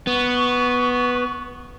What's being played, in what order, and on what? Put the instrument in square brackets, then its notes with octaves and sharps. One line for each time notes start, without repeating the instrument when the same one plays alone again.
[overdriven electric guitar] B3 [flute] C#6